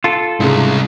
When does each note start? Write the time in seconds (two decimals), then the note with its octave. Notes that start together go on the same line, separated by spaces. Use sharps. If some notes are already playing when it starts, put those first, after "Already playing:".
0.04 F4 A4
0.40 C2 G#2 C#3 G#3 E4